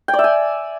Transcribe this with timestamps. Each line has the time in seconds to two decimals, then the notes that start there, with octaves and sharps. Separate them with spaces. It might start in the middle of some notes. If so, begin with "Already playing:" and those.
0.08 G5
0.14 D5
0.19 E5
0.24 G#5